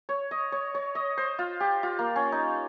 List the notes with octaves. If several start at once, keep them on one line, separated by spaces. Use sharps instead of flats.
C#5
D#5
C#5
C#5
D#5
C5
F4
G4
F4
A#3
C#4
D#4